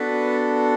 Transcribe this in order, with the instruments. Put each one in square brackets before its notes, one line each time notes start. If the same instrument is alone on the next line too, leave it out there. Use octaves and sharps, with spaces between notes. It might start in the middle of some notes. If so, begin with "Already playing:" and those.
Already playing: [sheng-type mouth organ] B3 D4 F#4 A4 B4